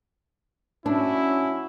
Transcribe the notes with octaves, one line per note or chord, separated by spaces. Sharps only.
F#3 C#4 D4 E4